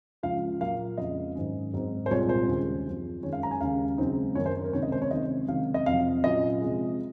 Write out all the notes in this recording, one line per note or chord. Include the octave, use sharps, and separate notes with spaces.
C#2 C#3 F3 F5
A#2 F#3 A#3 F5
F2 C#3 G#3 D#5
G#2 D#3 F#3 C#4
G#2 F#3 C4 D#4
C5
C2 A#2 G#3 C4 C#5
C5
D#2 C#3 G#3 C#4
F#2 F3 C4
F#2 D#3 G#3 C#4 C#5
F5
A#5
G#5
D#2 C#3 G#3 C#4 F5
C#2 C#3 F#3 C4 D#4
F#2 D#3 A#3 C#5
C5
A#4
C#2 C3 D#3 A#3 D#4 C#5
D#5
C5
C#5
C#2 C3 D#3 F#3 D#5
C#2 C3 D#3 F#3 C4 F5
D#5
F2 C3 F#3 F5
A#2 F#3 C#4 D#5
C3 F3 G#3